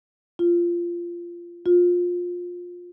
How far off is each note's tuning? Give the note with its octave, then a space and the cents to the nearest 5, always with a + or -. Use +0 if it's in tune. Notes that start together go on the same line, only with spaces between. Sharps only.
F4 -15
F4 +20